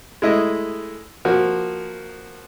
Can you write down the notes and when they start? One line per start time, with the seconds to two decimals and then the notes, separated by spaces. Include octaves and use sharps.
0.22 G#3 A3 E4 D#5
1.25 F3 A#3 F#4